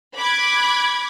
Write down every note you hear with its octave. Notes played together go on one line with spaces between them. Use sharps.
B5 D6 F#6 G#6